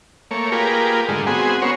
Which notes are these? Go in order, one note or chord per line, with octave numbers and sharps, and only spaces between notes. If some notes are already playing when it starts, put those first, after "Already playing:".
A3 A#3 C#5
A#3 F4 G4 G#4 A#4 B4
G#2 D3 G#3 A3
G#3 B3 C4 F#4 G#4
B3 C#4 F#4 A#4 C5 C#5